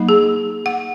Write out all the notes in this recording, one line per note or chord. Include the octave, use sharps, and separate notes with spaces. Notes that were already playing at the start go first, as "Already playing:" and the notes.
Already playing: F#3 A#3 D#4
G#4
F#5